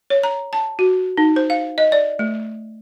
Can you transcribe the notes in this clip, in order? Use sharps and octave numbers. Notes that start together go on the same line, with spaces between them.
C#5
A#5
A5
F#4
D#4
C5
F5
D#5
D5
A3